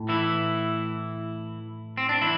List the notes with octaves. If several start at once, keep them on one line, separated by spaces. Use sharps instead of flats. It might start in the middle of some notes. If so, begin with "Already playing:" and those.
Already playing: A2
E3 E4
C4
D4
E3 E4